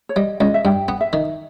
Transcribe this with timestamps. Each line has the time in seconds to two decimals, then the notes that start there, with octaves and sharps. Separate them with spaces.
0.09 C#5
0.16 G3 D#5
0.41 C#2 D#5
0.54 E5
0.65 G2 G5
0.88 B3
1.01 E5
1.13 D#3